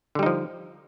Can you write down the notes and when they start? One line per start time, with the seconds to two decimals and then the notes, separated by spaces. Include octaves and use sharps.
0.15 D3
0.19 G3
0.23 D#4
0.26 F3